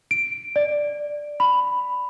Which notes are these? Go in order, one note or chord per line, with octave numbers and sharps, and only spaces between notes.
D7
D5
B5